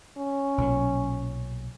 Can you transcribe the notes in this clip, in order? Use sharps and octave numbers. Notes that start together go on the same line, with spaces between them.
C#4
B1 A#2 F#3